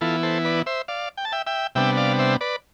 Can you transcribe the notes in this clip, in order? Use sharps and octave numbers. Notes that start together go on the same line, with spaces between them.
E3 B3 E4 F4 A4
A4 C5
B4 D5
C5 E5
D5 F5
G5
A5
E5 G5
E5 G5
C3 G3 B3 D4 E5 G5
D5 F5
C5 E5
B4 D5